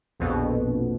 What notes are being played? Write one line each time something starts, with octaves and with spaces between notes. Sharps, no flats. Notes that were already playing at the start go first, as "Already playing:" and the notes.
A#1 F2 B2